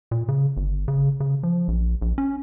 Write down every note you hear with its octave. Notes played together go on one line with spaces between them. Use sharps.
A#2
C#3
G1
C#3
C#3
F3
A#1
A#1
C#4